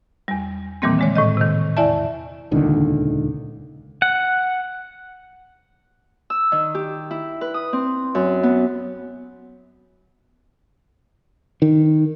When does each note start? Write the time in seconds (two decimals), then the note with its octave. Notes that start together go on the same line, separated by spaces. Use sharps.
0.28 E2 G3
0.82 A#2 D#3 E3 G3 A#3 C4
0.99 D3 G#3 C#5
1.16 A2 D#3 D#5
1.37 C3 D#3
1.77 E2 E4 D5 E5 A5
2.51 D#1 C#2 D3 D#3
4.02 F#5
6.30 E6
6.52 D#3
6.75 G4
7.11 E4
7.41 B4
7.54 D#6
7.73 C4
8.15 F#2
8.43 B3
11.62 D#3